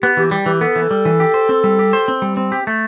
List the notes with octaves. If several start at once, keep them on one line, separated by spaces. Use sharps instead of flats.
B3 G4
E3 G4
G3 G4
E3 G4
B3 A4
E3
G3
E3
G4
C5
C4
G3
G4
C5
C4
G3
C4
G4
A3